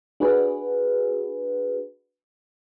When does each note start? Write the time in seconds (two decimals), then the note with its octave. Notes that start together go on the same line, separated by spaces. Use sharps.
0.20 D4 F#4 G#4 B4